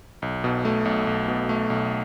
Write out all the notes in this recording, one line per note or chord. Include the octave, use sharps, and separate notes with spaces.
B1
B2
A3
B1
B1
B2
A3
B1